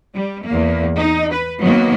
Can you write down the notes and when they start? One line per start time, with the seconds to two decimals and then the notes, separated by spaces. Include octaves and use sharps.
0.14 G3
0.48 E2 A#3
0.96 D#4
1.31 B4
1.60 D#3 F#3 A#3 B3